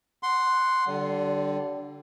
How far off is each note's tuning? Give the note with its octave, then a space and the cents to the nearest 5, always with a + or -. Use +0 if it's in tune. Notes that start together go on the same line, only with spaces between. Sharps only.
F#5 +0 C6 +0
D3 +0 G3 -35